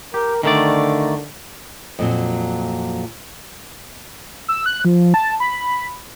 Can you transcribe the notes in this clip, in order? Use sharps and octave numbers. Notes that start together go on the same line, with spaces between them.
G4 A#4
D3 D#3 A3 D5
F2 A#2 F#3
E6
F#6
F3
A5
B5